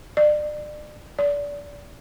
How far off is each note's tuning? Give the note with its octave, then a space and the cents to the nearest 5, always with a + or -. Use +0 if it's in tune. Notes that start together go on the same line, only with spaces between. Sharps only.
D5 +35
D5 -25